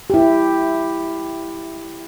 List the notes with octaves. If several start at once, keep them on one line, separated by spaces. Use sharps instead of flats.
E4 G4